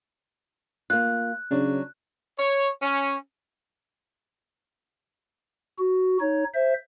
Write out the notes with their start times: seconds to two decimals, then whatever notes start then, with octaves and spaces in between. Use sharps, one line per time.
0.90 A#3 F4 F#6
1.51 C#3 F#3 D4
2.38 C#5
2.82 C#4
5.78 F#4
6.20 D#4 C#5
6.54 C5 E5